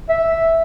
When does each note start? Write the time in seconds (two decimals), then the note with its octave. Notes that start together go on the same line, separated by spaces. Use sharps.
0.09 E5